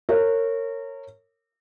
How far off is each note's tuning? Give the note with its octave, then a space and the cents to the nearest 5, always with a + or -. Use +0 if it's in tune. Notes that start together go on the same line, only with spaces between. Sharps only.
A#4 -30 C#5 -15